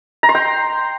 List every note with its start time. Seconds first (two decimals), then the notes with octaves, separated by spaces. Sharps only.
0.23 A#5
0.29 C6
0.35 G5